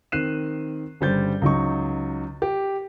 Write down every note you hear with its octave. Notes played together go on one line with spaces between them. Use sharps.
D#3 C4 F#6 C7 D#7 E7
G1 C#3 G3 C5 G6 A6
C#2 F#3 D#4 C#6
G4